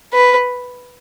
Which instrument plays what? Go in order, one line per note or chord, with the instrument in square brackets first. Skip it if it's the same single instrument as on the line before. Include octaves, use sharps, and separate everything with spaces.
[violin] B4